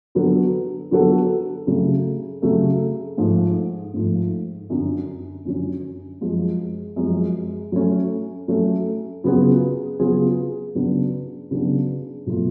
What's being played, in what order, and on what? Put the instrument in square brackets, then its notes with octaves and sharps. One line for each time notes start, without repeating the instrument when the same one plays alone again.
[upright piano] D3 F#3 B3 F#4 A4
D3 F#3 B3 F#4 A4
C#3 F#3 A3
C#3 F#3 A3
G#2 F3 A3
G#2 F3 A3
F#2 D3 F#3 C#4
F#2 D3 F#3 C#4
F#2 F3 G#3
F#2 F3 G#3
F#3 A3 C#4
F#3 A3 C#4
C#3 F#3 B3 F4 G#4
C#3 F#3 B3 F4 G#4
C#3 F#3 B3 D4
C#3 F#3 B3 D4
B2 F#3 A3 F4